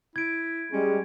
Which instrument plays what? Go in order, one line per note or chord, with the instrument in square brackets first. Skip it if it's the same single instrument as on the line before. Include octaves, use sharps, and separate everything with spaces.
[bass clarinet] E4 [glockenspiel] G#6 D7
[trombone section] G3 G#3 [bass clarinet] C#4